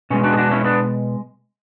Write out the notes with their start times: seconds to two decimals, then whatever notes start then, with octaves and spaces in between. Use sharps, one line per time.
0.10 B2 G#3 C#4
0.24 D4 F#4
0.33 G#4
0.37 D4 F#4
0.51 C#4 E4
0.64 B3 D4